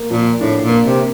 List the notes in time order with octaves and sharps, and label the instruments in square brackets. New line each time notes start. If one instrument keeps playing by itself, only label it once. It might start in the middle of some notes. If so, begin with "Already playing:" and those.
Already playing: [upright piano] A#3
[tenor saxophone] A#2 [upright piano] F3
[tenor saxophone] A2 [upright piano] D4
[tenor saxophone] A#2
[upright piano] A#3
[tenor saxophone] C3